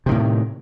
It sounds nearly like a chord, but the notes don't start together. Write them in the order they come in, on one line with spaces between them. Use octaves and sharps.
C3 D#3 A2